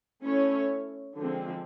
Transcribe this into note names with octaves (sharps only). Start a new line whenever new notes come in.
A3 C#4 E4 A4 C#5
D3 F3 G#3 C4